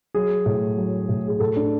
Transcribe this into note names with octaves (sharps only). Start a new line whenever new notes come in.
F#3 G#4
A2
F#3
A2
G#4
A2 A4
D4